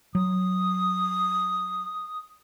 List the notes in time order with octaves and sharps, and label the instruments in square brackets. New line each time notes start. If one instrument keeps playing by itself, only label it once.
[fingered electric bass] F#3 [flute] D#6